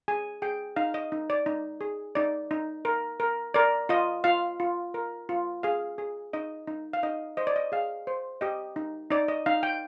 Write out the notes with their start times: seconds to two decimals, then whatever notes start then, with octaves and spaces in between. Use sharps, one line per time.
0.08 G#4 G#5
0.42 G#4 G5
0.76 D#4 F5
0.94 D#5
1.12 D#4
1.30 D5
1.46 D#4
1.81 G#4
2.15 D#4 D5
2.51 D#4
2.85 A#4
3.20 A#4
3.54 A#4 D5
3.89 F4 D#5
4.24 F4 F5
4.60 F4
4.94 A#4
5.29 F4
5.63 G#4 F5
5.98 G#4
6.33 D#4 D#5
6.67 D#4
6.93 F5
7.03 D#4 D#5
7.37 C5 D#5
7.47 D5
7.56 D#5
7.72 G#4 F5
8.07 C5
8.41 G4 D#5
8.76 D#4
9.11 D#4 D5
9.28 D#5
9.46 D#4 F5
9.63 G5